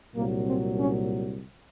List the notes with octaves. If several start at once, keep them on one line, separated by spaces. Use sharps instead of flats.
C2 A#2 F#3 A#3
C4
C#4